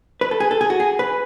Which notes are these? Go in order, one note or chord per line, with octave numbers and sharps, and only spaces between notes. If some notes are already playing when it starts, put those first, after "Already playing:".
B4
A4
G#4
A4
G#4
F#4
G#4
B4